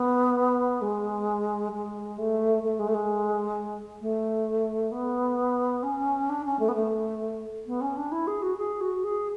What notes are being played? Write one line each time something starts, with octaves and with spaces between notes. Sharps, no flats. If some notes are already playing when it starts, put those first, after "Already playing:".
Already playing: B3
G#3
G#3
A3
A3
G#3
A3
G#3
A3
B3
C#4
D4
C#4
A3
B3
A3
B3
C#4
D4
E4
G#4
F#4
G#4
F#4
G#4